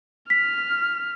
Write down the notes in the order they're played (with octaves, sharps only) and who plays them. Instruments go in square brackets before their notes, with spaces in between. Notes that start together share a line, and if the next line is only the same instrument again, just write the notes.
[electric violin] F6 [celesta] B6